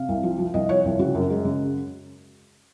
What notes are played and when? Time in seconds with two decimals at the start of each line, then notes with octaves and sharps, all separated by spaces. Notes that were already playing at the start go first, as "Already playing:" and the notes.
Already playing: C3 F5
0.09 C2
0.23 F3
0.38 F3
0.54 C2 D#5
0.69 F3 C#5
0.85 C2
0.99 C#3 F#4
1.15 F#2
1.30 G#3
1.45 C#3